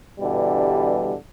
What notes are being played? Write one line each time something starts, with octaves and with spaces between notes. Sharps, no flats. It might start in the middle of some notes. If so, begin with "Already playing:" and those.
G2 B2 D3 E3 G3